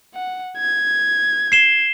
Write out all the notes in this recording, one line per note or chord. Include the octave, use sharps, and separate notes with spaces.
F#5
G#6
C7 E7 G7